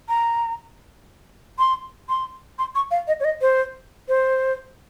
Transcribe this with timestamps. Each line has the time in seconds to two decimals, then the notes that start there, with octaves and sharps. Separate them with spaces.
0.09 A#5
1.59 C6
2.09 C6
2.59 C6
2.75 C#6
2.91 F5
3.08 D#5
3.20 C#5
3.25 D#5
3.41 C5
4.08 C5